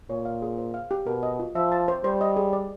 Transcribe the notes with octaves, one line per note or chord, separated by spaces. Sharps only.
A#2 C#5
F5
G#4
C5
F5
G4
B2 A#4
D#5
F4
F3 E5
A5
C5
G3 C5
D#5
G#4
D5